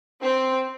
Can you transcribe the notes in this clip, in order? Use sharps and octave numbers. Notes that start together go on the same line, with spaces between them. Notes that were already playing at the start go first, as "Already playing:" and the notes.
C4